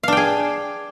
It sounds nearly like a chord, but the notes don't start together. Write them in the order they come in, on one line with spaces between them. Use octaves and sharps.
F5 D4 G5 G#4